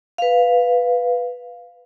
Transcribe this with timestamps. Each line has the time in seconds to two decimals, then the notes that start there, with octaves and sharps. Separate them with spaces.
0.18 B4 F5